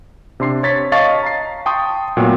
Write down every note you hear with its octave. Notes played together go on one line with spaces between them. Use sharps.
C3 D4 C6 C7
C#5 A6 B6
C#5 D#5 F5 A5 C#6 A6
A#5 C7
G5 A5 C6 C#6 D#6
A#2 F#3 A3 B3 G5